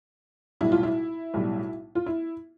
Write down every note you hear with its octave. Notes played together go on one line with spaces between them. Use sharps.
B1 A2 G3 E4
F4
E4
B1 A2 G3
F4
E4